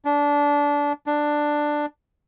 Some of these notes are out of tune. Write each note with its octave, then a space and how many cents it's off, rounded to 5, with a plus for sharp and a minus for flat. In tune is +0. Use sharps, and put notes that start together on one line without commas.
D4 -20
D4 +10